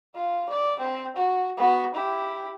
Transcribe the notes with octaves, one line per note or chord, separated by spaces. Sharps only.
F4
D5
C4
F#4
B3 F#4
E4 G4